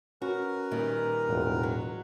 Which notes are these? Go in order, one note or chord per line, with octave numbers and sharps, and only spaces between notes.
C#4 F#4 A#4 B4 A#5
A#2 D#3 G3
E1 A2 F4
F#3